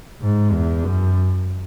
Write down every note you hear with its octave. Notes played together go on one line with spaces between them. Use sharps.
G#2
E2
F#2